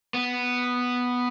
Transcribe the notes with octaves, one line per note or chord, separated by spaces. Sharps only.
B3